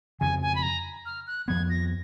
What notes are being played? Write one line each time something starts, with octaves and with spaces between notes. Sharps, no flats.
F2 C#3 F3 G#5
G#5
B5
A#5
F6
F#6
F2 F3 B3 G#6
A#6